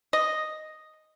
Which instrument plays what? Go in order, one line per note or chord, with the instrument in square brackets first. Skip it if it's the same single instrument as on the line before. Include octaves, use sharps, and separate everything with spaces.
[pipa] D#5